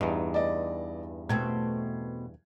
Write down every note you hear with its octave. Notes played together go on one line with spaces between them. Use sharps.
E2 G2 D#4
D5 D#5
B2 A3 C4 G#6